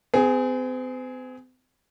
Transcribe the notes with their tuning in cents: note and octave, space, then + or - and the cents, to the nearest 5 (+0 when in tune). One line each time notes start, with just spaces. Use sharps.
C4 -45 G#4 +0